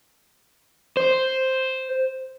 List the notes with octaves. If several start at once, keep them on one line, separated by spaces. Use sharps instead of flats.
C5